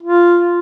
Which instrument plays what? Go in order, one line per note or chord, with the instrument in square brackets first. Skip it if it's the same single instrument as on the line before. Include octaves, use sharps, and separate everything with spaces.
[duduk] F4